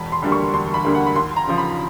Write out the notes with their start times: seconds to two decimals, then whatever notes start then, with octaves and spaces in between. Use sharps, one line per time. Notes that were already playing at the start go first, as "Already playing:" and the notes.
Already playing: E1 B5
0.12 C6
0.22 D2 D3 G3 A#3
0.32 C#6
0.53 E1 C6
0.74 B5
0.85 D2 D3 G3 A#3
0.95 F#5
1.07 B5
1.16 D#2 C6
1.36 A#5
1.47 C#3 F3
1.58 B5